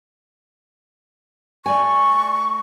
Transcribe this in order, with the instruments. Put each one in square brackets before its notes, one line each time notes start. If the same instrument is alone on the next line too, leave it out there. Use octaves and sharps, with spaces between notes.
[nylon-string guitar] A3 D5 G#5 [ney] C#6